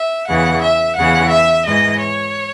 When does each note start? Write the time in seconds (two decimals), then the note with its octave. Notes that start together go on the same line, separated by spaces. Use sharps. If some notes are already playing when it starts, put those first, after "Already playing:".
Already playing: E5
0.28 E2 C#3 E3 F#5
0.62 E5
0.97 E2 C#3 E3 F#5
1.31 E5
1.65 G#2 E3 D#5
1.99 C#5